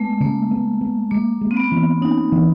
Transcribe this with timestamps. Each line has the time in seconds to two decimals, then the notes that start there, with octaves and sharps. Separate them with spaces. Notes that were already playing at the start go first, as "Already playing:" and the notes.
Already playing: G#3 A3 B3
0.20 C#3 A#3
0.51 B3
0.81 B3
1.11 G#3 A#3
1.41 G#3
1.51 C4
1.57 B3
1.72 E3
2.02 C#4 D#4
2.32 E3